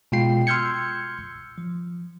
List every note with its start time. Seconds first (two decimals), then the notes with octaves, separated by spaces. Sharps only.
0.12 B2 G#3 F4 G5 C7
0.47 C6 E6 F6 G6 G#6 C#7
1.58 F3